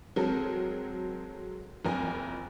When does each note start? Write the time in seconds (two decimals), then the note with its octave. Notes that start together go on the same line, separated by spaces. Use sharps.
0.16 F#3 G#3 C4 A4 A#4
1.85 F#1 F2 A#4 G#5